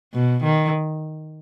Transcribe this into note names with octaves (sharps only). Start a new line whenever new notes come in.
B2
D#3